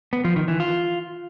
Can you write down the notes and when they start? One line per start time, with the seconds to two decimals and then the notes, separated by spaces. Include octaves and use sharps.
0.13 B3
0.24 F3
0.36 D#3
0.48 E3
0.60 F4